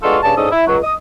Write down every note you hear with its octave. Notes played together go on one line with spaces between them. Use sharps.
G#3 B3 D4 F4 F#4 A4
G2 C#3 D5 A5
G#2 C#4 D4 A4 D#5 D#6
E4
C#2 F#3
D#5 D#6